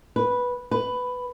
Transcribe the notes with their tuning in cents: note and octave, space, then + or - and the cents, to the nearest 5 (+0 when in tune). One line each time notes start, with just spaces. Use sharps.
B4 -5
B4 +10